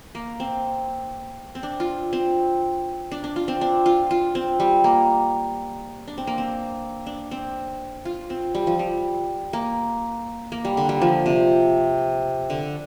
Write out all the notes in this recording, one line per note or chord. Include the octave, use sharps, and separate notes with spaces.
A#3
C4
C4
D4
F4
C4
D4
D4
F4
C4
D4
F4
F4
C4
G3
A#3
D4
C4
A#3
C4
D4
C4
F4
C4
G3
F3
G3
A#3
A#3
G3
D3
G3
F3
C3
D3